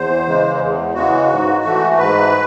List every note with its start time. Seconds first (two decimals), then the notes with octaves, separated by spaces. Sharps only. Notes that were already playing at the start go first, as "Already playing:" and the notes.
Already playing: E2 C5
0.26 C#3 E3 G#3
0.59 E2
0.94 C#3 E3 G#3 F#4
1.29 G#2
1.65 E3 A3
1.98 G#2 B4